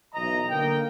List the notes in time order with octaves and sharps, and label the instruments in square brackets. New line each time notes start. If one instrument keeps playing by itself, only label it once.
[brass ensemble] B1 E3 D#5 A#5
D3 A#3 D#4 G5